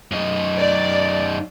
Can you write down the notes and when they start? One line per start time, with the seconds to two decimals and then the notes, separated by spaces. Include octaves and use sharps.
0.12 F#2 D#4
0.58 D5